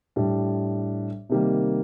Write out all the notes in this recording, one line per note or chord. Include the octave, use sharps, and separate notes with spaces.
A2 G3 D4
C3 D#3 G3 A#3